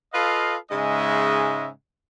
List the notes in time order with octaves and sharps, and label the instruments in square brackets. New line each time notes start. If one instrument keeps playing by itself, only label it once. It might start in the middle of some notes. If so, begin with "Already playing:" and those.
[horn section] F4 A4 B4 D#5 F5
G#2 C#3 G#3 D#5 E5